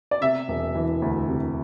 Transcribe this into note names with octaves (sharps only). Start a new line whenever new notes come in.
D5
C3 E5
E1
E3
D2
C3